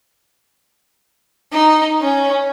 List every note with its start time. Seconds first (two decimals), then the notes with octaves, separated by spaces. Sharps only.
1.52 D#4
2.02 C#4